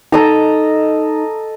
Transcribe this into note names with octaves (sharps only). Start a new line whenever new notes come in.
D#4 A4 D#5 A#5